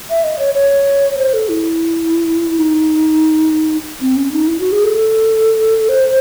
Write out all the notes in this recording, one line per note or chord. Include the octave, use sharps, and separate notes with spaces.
E5
D#5
C#5
C#5
C5
A4
E4
D#4
C4
C#4
D#4
E4
F#4
G#4
A4
C5